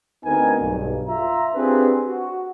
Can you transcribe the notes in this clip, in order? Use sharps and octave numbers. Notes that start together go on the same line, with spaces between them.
D2 B3 C4 D#4 A#4 G#5
B1 G2
F4 E5 A#5
C4 D4 F4 G4 G#4 B4
F#4